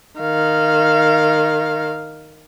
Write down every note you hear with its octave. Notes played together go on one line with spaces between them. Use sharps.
D#3 F5